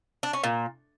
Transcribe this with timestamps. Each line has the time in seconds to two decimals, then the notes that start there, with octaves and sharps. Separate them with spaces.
0.23 D4
0.33 C#4
0.44 A#2